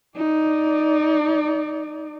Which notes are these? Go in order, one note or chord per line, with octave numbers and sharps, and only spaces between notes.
D#4 D5